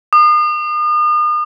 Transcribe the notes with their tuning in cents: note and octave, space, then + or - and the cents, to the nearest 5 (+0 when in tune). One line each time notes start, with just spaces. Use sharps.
D#6 -40